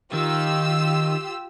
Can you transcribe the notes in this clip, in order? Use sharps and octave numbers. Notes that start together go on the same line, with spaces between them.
D#3 F4 G4 E6